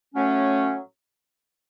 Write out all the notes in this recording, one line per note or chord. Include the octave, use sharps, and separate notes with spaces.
A2 F#3 A3 C#4